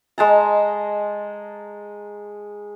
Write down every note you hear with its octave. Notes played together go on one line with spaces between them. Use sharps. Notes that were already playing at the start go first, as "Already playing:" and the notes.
G#3 A5 A#5